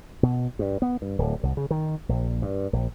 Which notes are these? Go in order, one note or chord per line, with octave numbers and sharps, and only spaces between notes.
B2
G2
B3
G2
D1
C2
C#3
D#3
A#1
G2
A#1